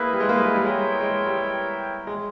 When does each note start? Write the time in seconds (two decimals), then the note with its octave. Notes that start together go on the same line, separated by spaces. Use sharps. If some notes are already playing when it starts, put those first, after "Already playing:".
Already playing: A#3 E4 G#4 B4
0.13 G3
0.20 G#3
0.29 A#3
0.38 G3
0.46 G#3
0.55 G3
0.64 G#3 B3 E4 A#4 C#5 G5
1.01 G#3
1.27 G3
2.07 G#3